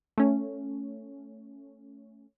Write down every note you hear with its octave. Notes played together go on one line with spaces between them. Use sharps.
A3 C#4